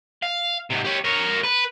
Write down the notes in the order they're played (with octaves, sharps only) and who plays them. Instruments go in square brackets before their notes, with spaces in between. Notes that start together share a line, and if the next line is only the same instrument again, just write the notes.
[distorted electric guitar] F5
G#2 C3
G4 C#5
A#4 C#5
B4